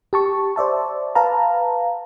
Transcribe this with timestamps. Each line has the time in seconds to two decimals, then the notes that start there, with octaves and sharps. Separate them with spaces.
0.13 G4 A5 C#6
0.56 C5 D5 E5 A5
1.15 B4 F5 A5 A#5